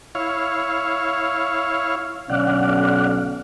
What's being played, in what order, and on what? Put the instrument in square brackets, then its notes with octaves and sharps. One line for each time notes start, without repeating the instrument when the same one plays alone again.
[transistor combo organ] E4 C#5 F5
[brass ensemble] B1 D3 C#4 [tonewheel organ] D5 F5 F#5